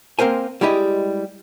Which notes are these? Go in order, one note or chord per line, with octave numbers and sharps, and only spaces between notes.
A#3 C4 A#4 C5 G#5
G3 G#3 E4 G4 D#5